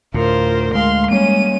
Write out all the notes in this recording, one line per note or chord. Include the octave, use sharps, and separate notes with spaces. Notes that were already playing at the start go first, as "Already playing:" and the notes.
D2 A2 F4 A#4 C5
G#3 F5 C6
G3 A#3 C#4 D#7